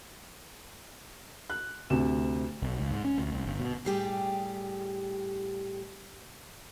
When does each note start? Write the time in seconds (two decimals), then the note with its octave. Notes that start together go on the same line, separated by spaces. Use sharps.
1.50 F#6
1.90 D2 C3 E7
2.62 B1
2.79 C#2
2.91 G#2
3.04 C#4
3.18 D2
3.32 C2
3.46 G1
3.60 B2
3.85 A2 G3 G4 G#4